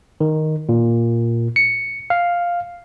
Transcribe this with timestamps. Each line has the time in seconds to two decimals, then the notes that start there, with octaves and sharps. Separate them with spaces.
0.21 D#3
0.69 A#2
1.56 C#7
2.10 F5